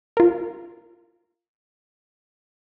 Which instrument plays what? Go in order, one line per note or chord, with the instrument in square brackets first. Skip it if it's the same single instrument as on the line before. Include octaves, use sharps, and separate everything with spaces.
[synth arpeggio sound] F4 A#4